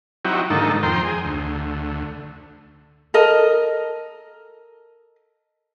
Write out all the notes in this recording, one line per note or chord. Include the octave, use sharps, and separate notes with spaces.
F#3 C4 D#4 E4 F#4 G4
G#2 D3 D#3 A#3 D#4 A4
F2 C5 G5 A#5 C6
G#4
D2
A4 A#4 D#5